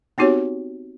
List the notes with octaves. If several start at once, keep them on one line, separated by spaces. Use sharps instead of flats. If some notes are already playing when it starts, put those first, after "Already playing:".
B3 C4 D#4 F#4 G4 C#5